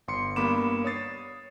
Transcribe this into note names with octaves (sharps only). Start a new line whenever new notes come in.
G1 C6 C#7
G2 A#3 B3 B5 D6 E7
C#5 D#6 A6 C7